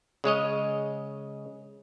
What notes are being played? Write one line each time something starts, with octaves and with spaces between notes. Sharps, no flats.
C#3 G#3 C#5 D#5